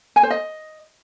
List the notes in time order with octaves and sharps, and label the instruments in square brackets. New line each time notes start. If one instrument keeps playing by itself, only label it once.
[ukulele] G#5
C5
D#5